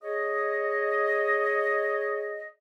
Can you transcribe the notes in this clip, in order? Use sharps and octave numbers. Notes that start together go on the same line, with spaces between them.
G#4 C#5 D#5